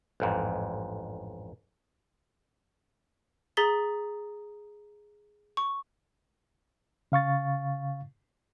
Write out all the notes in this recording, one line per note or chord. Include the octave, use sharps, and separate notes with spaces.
A1 F2 G#2
G#4 A#5 D#6 A6 B6 G7
C#6
C#3 F5 C#6 A6